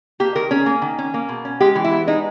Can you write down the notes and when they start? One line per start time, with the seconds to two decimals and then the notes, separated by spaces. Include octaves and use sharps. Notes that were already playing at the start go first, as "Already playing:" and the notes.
0.20 A#3 G4
0.35 D#3 A#4
0.51 C#4 G#4
0.66 A#3
0.82 D#3
0.98 C#4
1.14 A#3
1.29 B2
1.45 C#4
1.60 G#3 G4
1.75 E3
1.84 E4
1.91 B3
2.07 G#3 D#4